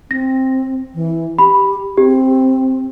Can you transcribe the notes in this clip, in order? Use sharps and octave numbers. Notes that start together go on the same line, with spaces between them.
C4 A#6
E3
G4 B5
C4 G4